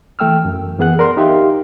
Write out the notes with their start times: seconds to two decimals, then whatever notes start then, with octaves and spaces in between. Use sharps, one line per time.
0.19 E3 A3 G5 E6 F6
0.45 F#2
0.78 F#2 E3 B3 G#4 F#5 F#6
0.99 A#4 D5 A#5 C6
1.17 D#4 G4 E5 F5 C6